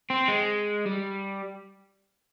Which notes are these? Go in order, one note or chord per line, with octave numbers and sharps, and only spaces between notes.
C4
G#3
G3